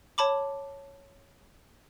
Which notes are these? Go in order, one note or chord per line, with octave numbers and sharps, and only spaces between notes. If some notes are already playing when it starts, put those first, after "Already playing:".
C#5 A5 B5 D6